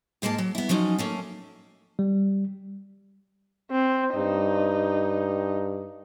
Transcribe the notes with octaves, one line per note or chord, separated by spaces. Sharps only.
G#2 G#3 A#3 A#4 A5
F#3
B3 E4
F3 F#3 C#4 D#4
A3 A#3 C#4
G3
C4
G2 D#4